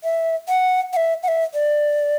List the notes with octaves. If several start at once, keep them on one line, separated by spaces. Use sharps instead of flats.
E5
F#5
F#5
E5
F#5
E5
D5